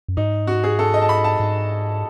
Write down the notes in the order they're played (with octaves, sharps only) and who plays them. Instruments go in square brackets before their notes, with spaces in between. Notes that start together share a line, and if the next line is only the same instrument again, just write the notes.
[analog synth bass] F#2
[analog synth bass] G#2 [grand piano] D#4
[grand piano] F#4
G#4
A4
D#5
A5
B5
A5
[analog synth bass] G#2